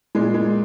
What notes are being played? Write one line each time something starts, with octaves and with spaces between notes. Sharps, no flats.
A#2 G#3
G#3